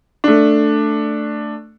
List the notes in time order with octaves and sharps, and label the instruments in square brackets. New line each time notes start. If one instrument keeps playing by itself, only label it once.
[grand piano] A3 D4